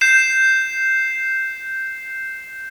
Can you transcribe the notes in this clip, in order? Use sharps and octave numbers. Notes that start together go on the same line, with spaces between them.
G6 C7 E7